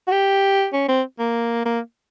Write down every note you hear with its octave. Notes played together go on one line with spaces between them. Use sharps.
F#4
G4
C#4
C4
A#3
A#3